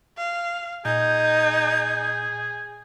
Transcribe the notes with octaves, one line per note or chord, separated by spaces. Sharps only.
F5
A#2 D#4 G#4 G6